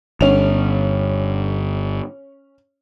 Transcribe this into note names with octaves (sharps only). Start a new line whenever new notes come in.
G1 C#4 F7